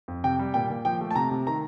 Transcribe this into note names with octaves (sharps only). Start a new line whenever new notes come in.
F2
C3 G5
G3
A#2 G5
A#2
F3 G5
A3
A5
C3 A#5
C3
D#3 A#5